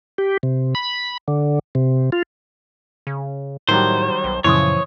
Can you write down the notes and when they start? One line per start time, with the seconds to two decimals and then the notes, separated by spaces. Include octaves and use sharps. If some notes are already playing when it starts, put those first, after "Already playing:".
0.18 G4
0.43 C3
0.75 B5
1.28 D3
1.75 C3
2.12 F4
3.07 C#3
3.69 A2 D#3 F#3 G3 C5
4.24 B1
4.44 F#2 A#2 C#3 E3 F3 C#5 C6 D#6